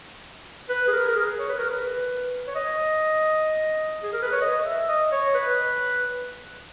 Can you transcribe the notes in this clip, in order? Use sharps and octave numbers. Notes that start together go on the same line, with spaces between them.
B4
G#4
A#4
A#4
G#4
C#5
B4
A#4
B4
C#5
D#5
G#4
A#4
B4
C#5
D#5
E5
D#5
C#5
B4